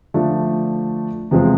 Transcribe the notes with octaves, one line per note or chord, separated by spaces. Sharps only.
D3 F3 A3 D4
E2 C3 F3 G#3 C4